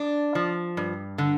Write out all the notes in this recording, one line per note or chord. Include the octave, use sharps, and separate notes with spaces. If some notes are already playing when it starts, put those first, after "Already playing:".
Already playing: D4
F3
G2
D3